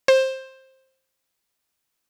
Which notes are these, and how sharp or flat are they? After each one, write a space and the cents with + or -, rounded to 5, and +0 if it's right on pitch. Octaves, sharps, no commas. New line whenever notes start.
C5 +15